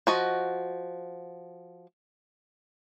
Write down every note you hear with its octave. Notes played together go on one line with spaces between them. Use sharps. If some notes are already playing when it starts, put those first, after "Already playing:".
F3 F#4 D#5